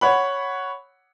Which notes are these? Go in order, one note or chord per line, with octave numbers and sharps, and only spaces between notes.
C#5 F#5 B5